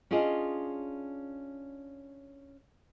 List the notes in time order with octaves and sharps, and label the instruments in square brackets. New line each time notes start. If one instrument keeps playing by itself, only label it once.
[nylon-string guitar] C#4 D4 F4 G#4 D#5